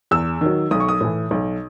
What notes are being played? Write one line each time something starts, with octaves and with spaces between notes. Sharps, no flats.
E2 E6
D#3 F#3
B1 D#6
C#6
D#6
A2 E3
B1